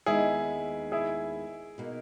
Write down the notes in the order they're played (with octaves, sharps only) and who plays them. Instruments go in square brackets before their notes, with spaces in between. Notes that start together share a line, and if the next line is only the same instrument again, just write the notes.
[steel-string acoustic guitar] D#2 D#3 G#3 B3 [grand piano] E4 G#4
[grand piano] E4 G#4
[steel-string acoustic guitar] B2 A#3 D#4